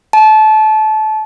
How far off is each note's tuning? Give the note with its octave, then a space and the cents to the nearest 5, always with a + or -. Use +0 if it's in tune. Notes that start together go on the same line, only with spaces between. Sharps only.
A5 -25